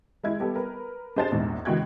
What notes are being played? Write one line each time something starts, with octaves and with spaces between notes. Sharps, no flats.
G#3 E4 G#6
G3 B3 G4 A4 B4
A#4 B4
D4 G#4 C5 A5 A6 E7
A#1 E2 G#2
C#2 E3 F#4 G5 F#6 G#6